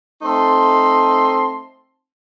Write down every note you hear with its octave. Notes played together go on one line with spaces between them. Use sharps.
A3 C4 D#4 A5 C6